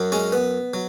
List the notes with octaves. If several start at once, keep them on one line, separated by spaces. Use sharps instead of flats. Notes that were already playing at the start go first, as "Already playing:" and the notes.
Already playing: F#2 F#3
G#3 C#4
B3
F#3